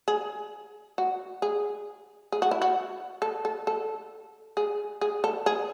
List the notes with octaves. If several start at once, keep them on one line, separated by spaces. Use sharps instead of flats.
G#4
F#4
G#4
G#4
F#4
E4
F#4
A4
A4
A4
G#4
G#4
A4
G#4